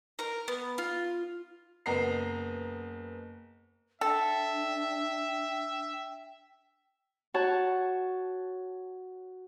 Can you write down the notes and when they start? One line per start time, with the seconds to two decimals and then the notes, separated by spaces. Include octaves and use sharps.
0.19 A#4 A#5
0.48 B3
0.78 F4
1.86 F#1 B3 A#5 C7
4.01 D4 A4 E5 G5
7.34 F#4 C#5 A5